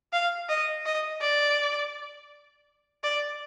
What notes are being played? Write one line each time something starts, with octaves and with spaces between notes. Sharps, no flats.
F5
D#5
D#5
D5
D5